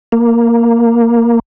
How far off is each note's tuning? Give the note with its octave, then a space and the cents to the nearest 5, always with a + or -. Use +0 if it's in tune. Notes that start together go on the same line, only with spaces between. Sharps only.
A#3 +0